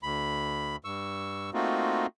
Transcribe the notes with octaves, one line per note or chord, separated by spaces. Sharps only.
D2 B5
G2 C#6 E6
A3 A#3 C4 D#4 F4 F#4